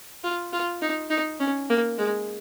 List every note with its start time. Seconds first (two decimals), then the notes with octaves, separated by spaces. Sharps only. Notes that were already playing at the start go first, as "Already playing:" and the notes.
0.24 F4
0.53 F4
0.82 D#4
1.10 D#4
1.40 C#4
1.69 A#3
1.98 G#3